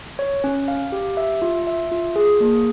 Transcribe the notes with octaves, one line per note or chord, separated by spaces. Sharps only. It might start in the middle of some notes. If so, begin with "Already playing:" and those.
C#5
C#4
F5
G4
E5
F4
E5
F4
G#4
A#3